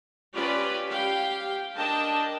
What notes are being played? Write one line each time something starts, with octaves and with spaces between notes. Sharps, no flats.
C#4 F4 G4 B4 D5
G4 F5 G5
D4 A#4 D#5 G5 A5